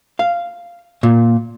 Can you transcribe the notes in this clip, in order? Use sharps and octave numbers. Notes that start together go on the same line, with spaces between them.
F5
A#2